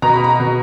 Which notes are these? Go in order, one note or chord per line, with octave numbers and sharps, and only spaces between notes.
B2 A#5
B5
A#5
B2